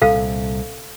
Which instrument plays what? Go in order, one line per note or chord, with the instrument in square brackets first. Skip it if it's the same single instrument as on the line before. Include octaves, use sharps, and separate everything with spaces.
[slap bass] C2 A#2 [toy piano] A4 F5